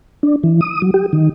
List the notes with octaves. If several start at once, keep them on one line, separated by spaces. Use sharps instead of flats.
D4
E3
D#6
F#3
G4
D#3